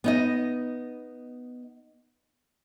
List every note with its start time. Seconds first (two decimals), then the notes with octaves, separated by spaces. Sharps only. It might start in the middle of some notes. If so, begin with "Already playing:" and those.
0.04 B3 D#4 D#5